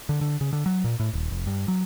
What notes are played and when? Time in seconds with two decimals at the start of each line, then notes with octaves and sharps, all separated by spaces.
0.09 D3
0.21 D3
0.41 C#3
0.53 D3
0.66 F#3
0.84 A#2
1.00 A2
1.13 D#1
1.31 F1
1.47 G2
1.68 F#3